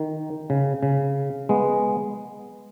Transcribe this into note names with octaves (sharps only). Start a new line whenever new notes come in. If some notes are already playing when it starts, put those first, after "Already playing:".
Already playing: D#3
C#3
C#3
G#3 B3